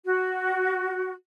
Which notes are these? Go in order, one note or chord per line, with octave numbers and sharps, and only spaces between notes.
F#4